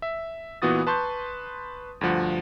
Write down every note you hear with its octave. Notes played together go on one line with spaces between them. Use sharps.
E5
A#2 E3 B3 F#4 D#6 A6
B4 A5 C6 C#6 G6
D2 G2 F3 F#5